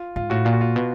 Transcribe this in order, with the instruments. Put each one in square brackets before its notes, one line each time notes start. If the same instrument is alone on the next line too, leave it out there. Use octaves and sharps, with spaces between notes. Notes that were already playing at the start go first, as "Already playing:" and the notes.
Already playing: [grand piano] F4
[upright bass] G#2 [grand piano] F4
[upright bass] A2 [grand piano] F#4
[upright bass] A#2 [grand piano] F4
[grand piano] F#4
F4
[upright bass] B2